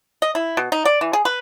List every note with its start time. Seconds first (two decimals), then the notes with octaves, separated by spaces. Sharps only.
0.22 D#5
0.35 E4
0.57 B2
0.72 D#4
0.85 D5
1.01 E3
1.13 G#4
1.25 B4